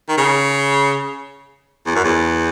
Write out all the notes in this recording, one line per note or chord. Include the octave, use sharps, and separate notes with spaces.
D#3
C#3
E2
F#2
E2